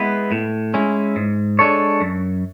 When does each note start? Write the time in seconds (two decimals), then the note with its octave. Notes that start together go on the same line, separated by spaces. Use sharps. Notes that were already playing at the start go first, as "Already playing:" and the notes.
Already playing: G#3 B3 E4 B4
0.32 A2
0.74 G#3 C#4 E4
1.16 G#2
1.59 G#3 D4 A4 C#5
2.01 F#2